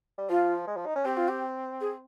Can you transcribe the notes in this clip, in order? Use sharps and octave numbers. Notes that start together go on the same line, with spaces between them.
G3
F3 F4
G#3
F3
D#4
C#4
C4 G4
F4
G4
G#4